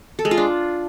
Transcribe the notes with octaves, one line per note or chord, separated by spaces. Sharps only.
A4
G#3
F4
D4